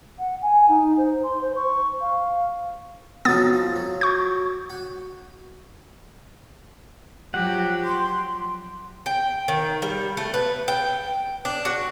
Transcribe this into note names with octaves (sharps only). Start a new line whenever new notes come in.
F#5
G#5
D#4
C5
C6
C5
C#6
F5
F2 F#3 B3 D#4 D#6 A6
F3
F#3
C#6 G6
F#4
F3 F#3 G4 F#5
C6
G5
D#3
G3
A3
B4
G5
D4
F#4